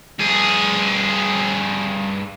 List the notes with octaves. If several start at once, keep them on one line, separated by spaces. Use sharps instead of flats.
G2 G#4